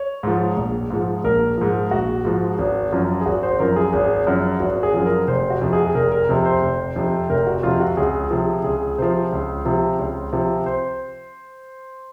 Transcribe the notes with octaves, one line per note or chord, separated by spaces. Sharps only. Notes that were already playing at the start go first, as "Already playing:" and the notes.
Already playing: C#5
G#2 F3
A#1
G#2 F3
A#1 A#4
G#2 F3
A#1 F#4
G#2 F3
G#1
F#2 F3
G#4
G#1 F#4
C5
F#2 F3 A#4
G#4
G#1
F#2 F3
G#1 F#4
G#4
F#2 F3
A#4
F1 C5
F#4
F2 C3
G#4
F1 A#4
A#4
F2 C3
C5
F1
F2 C3
F1 A#4
F#4
F2 C3 F4
F#4
C#2 G#4
C3 F3
C#2 G#4
C3 F3 C5
C#2
C3 F3
C#2
C3 F3
C5